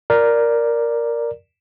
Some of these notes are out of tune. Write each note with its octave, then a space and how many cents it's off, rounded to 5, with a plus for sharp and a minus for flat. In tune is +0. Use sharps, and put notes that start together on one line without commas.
A#4 +0 D5 +0